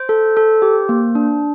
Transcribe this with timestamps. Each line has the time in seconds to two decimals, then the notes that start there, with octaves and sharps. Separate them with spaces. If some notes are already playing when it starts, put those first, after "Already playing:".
Already playing: C5
0.09 A4
0.37 A4
0.62 G4
0.89 A#3
1.15 D4